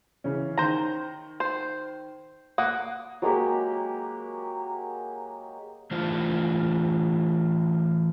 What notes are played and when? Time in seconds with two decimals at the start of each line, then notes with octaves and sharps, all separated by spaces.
0.24 C#3 E3 C#4
0.58 D#3 C5 A#5
1.40 C5
2.58 A#3 F#5 D#6
3.22 F#3 G#3 A#3 G4
5.91 E3 A3 D4 F4 C5